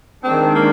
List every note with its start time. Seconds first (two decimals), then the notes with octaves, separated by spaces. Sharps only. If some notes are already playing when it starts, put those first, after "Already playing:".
0.24 D#3 G#3 C4 D4
0.55 A#3